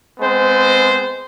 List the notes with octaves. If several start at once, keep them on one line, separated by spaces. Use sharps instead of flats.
G#3 B3 C4 C5